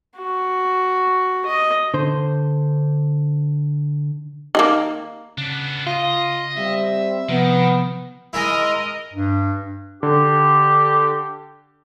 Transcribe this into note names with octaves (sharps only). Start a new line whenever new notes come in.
F#4
D#5
D3 C5
D#3 G#3 A#3
C#3 B3 D4
F4 D#5
G3 C4 E5
C3 D#3 F3 B3
G#3 E4 A#4 D#5
G2
D3 G4